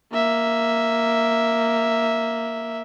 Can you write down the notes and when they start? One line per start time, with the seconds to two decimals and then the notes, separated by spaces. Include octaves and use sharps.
0.12 A#3 E5